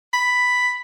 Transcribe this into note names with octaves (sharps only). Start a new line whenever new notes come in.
B5